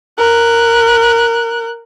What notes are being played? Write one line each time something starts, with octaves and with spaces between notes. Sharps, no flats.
A#4 F#6